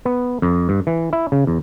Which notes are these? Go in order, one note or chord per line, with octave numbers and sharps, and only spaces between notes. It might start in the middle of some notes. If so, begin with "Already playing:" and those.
B3
F2
G2
E3
E4
C#3
E2